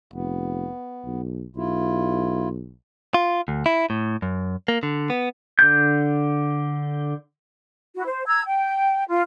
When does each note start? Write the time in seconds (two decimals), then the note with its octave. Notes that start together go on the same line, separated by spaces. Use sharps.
0.13 F1 B3
1.05 B1
1.56 B1 E4 F4
3.14 F4
3.48 D2
3.66 E4
3.90 A2
4.22 F#2
4.68 A#3
4.83 D3
5.10 B3
5.59 D3 G6
7.94 E4 F#4
8.06 C5
8.27 A#5 E6 G#6
8.45 G5
9.08 F4